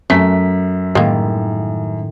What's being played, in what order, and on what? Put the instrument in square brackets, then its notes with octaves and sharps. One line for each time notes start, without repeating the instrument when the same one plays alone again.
[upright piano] F#2 B6 [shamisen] A3
[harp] A2 D#3 G3 [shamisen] G#3 A#3